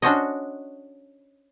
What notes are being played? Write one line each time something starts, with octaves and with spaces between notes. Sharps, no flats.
C#4 D4 F#4 C5 C#5 D#5